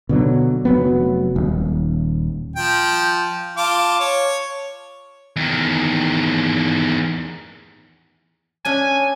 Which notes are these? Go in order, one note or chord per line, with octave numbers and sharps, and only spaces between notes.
B2 D3 F#3
F1 F#3 B3
D#1
F3 G5
F4 A5 D6
C#5
E2 D#3
C#4 D4 E5 G#5